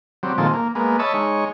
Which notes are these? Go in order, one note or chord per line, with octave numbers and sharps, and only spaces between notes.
F#3 G3 C4
A#2 D#3 F3 G#3 C4 A4
A#3
G#3 A#3 B3
C#5 D#5 E5 A5 B5
G#3 D#4 C#5